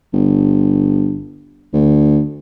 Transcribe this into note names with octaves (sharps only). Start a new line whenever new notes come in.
G1
D2